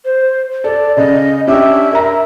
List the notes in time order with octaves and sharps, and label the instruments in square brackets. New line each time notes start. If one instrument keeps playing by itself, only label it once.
[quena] C5
[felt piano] A4 [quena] D5
[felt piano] C#3 [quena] D#5
[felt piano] C#4 D4 G4 [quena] E5
[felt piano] A#4 A#5 [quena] E5